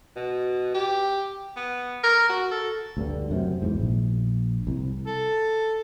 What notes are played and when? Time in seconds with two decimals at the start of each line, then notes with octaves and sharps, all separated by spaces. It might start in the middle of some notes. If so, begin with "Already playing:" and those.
0.16 B2
0.74 G4
1.56 B3
2.03 A#4
2.29 F#4
2.51 A4
2.97 D2 G2 D3
3.31 F#2 C3
3.62 E2 G#2
3.80 A#1
4.67 C2
5.06 A4